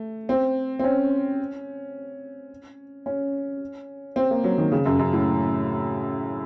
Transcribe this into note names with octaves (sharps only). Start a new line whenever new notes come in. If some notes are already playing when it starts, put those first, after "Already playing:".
Already playing: A3
C4
C4
C#4
C#4
C4
A#3
F#3
D#3
C#3
F#2
F#2
A2